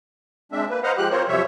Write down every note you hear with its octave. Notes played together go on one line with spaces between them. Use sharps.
G#3 C4 D4 E5
A#3 B4
B4 C5 D#5 F5 F#5 A#5
F3 G#3 G4 F#6
C4 F4 A#4 C5 C#5
F#2 C3 F3 G3 C#5 E5